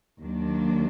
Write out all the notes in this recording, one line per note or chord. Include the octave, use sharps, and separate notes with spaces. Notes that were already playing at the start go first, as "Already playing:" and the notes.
D#2 D#3 F#3 A#3 D4